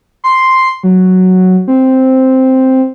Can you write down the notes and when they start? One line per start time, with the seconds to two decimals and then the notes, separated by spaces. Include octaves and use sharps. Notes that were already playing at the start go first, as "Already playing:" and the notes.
0.24 C6
0.84 F#3
1.68 C4